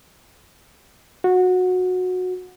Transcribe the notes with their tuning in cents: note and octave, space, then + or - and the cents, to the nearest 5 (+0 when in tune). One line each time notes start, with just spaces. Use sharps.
F#4 -20